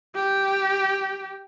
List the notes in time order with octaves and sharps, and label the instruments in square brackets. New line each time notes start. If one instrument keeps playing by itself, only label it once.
[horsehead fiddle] G4